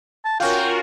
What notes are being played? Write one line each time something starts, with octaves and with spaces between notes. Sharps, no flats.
A5
C#4 F4 F#4 A#4 D5 F5 G5